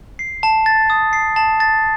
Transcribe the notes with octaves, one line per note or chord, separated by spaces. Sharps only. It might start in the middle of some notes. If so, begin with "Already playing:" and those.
C7
A5
A6
D#6
C7
A5
A6